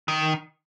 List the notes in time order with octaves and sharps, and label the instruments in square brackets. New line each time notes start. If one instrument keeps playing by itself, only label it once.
[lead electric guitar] D#3